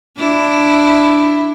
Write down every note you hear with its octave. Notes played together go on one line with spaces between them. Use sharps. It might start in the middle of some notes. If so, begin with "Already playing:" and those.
D4 E4